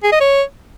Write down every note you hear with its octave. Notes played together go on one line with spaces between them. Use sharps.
G#4
D#5
C#5